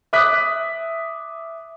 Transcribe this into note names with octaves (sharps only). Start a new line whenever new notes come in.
E5 D6 D#6 F#6 B6